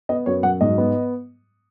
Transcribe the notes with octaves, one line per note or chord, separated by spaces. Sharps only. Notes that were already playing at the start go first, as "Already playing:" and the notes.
B3 D#5
F#2 C#5
F#3 F#5
G#2 D#5
B3